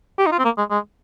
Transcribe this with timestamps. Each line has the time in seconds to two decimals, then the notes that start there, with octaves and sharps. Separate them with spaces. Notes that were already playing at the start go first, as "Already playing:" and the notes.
0.18 G4
0.26 D#4
0.32 F4
0.39 C4
0.45 A#3
0.58 G#3
0.70 G#3